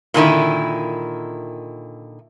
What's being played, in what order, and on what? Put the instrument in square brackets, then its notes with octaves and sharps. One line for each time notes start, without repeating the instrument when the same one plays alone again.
[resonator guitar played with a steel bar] A#2 D3 D#3 E4